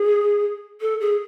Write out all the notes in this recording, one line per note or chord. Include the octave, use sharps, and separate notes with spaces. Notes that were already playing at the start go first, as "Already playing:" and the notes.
Already playing: G#4
A4
G#4